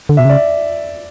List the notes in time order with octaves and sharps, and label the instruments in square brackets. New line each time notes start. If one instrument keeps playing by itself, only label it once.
[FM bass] D3
[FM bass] B2 [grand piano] E5
[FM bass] C#3 [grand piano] D5